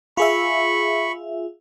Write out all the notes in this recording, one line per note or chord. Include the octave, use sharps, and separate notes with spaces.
F4 G#4 E5 B5 C#6